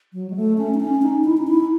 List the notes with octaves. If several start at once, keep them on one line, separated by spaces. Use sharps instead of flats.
F#3
G#3
A3
C#4
D#4
C#4
D#4
E4
D#4
E4